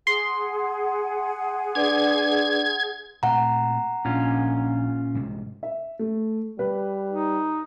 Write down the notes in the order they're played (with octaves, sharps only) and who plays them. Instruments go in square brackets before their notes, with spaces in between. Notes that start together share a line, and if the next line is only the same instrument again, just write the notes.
[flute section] G#4 F#5 [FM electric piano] C6
[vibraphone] D4 B4 D5 [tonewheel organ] G#6
[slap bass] A#2 A3 C4 [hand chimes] F#5 A#5
[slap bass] A#1 D4 [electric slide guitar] A#2 C#4 F4
[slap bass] C2 G#2 C3
[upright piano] E5
A3
[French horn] G3 [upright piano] B4
[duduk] D#4